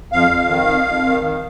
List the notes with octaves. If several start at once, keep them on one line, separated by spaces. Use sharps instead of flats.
F2 F5
F2
D#3
F2
F2
D#3
D#3